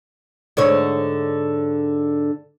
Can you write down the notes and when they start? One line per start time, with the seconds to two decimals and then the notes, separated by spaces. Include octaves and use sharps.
0.57 G#2 D3 C#5